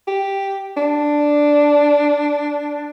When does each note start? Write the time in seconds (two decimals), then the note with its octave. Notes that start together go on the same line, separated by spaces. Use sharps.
0.07 G4
0.77 D4